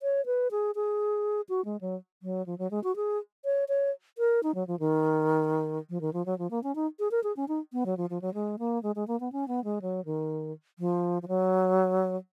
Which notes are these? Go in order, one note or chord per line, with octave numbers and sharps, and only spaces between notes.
C#5
B4
G#4
G#4
F#4
G#3
F#3
F#3
F3
F#3
G#3
F#4
G#4
C#5
C#5
A#4
D#4
F#3
F3
D#3
F3
D#3
F3
F#3
F3
A#3
C#4
D#4
G#4
A#4
G#4
C#4
D#4
B3
F#3
F3
F3
F#3
G#3
A#3
G#3
G#3
A#3
B3
C#4
B3
G#3
F#3
D#3
F3
F3
F#3